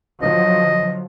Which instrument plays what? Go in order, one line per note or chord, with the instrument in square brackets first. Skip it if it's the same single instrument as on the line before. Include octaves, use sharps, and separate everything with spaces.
[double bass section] D3 F3 F#3 [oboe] D#5